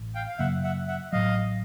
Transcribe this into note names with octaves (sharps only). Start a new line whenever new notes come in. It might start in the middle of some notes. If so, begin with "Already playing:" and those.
Already playing: A1
F5 G5
F5
F#2 C#3 F#3 A#3 E5 F#5
E5 F#5
E5 F#5
A1 A2 F#3 D#5 F5